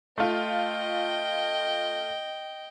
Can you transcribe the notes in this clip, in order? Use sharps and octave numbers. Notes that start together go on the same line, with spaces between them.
A3 F4 D#5 G5